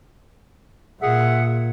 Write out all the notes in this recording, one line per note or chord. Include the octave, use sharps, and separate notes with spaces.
A#2 G#4 E5 F#5